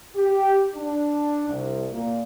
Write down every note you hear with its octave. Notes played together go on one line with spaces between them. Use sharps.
G4
D4
C2
A#2